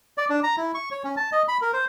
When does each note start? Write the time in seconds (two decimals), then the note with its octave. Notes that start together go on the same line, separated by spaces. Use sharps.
0.18 D5
0.30 D4
0.43 A#5
0.57 E4
0.75 C#6
0.91 C#5
1.04 C#4
1.17 A5
1.32 D#5
1.48 B5
1.61 A#4
1.73 C5